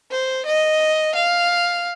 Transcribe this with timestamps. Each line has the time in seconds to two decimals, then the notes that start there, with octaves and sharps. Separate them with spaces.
0.10 C5
0.46 D#5
1.14 F5